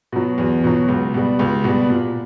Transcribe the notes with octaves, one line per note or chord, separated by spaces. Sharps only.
B2 F#3
E2
B2 F#3
C#2
B2 G3
C#2
B2 G3
A#2